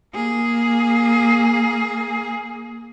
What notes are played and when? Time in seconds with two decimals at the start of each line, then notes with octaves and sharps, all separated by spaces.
0.13 A#3 G#4